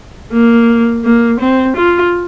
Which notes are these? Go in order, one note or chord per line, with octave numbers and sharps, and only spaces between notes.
A#3
A#3
C4
F4